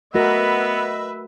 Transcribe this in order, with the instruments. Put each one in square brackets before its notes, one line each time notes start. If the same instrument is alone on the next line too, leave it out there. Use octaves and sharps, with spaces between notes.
[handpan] A3 F#4 A#4 [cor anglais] B3 [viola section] B4 E5 [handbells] D#5 A#6